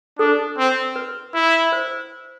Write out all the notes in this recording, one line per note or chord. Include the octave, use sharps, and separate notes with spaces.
D4 A4
C4
B4
E4
C5